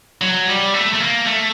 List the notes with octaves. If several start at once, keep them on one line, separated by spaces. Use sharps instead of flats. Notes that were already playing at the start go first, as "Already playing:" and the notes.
F#3
G3
A3
A3
A#3
A3